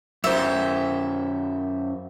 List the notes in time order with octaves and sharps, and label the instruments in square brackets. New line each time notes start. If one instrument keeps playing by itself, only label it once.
[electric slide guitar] F#2 C5 [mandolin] E5